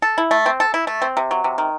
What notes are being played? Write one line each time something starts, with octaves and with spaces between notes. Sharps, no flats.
A4
E4
A3
C4
A4
E4
A3
C4
C3
F#3
C3
D#3